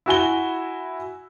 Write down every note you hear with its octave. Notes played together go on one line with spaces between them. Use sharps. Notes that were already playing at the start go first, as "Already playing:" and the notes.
E4 F#4 G#5 G7